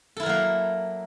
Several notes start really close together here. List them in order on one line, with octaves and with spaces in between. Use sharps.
A4 E4 A#4 F#3 A#3